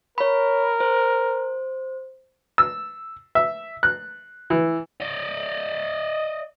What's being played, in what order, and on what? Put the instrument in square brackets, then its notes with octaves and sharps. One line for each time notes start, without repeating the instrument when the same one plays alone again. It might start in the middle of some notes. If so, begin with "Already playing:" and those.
[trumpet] A#4 [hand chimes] C#5 B5
[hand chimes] C5
[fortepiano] E6
E5
F#6
E3
[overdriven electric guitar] D5 D#5